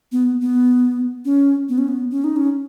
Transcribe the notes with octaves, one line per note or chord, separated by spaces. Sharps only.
B3
B3
C#4
B3
C#4
B3
C#4
D#4
C#4